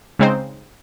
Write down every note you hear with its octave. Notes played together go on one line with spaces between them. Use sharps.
C#3 G#3 C4 D#4 C5